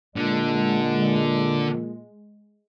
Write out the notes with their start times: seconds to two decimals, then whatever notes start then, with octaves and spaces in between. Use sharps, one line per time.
0.16 A#2 D3 G#3